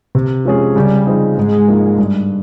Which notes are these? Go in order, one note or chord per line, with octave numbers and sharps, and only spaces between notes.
C3
F3 G#3 C#4 G#4
C#3 G3
F3 C4 D#4 G#4
G#2 G#3
F3 A#3 D#4 G#4
G2